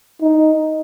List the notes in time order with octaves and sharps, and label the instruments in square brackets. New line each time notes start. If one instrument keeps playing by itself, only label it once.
[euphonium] D#4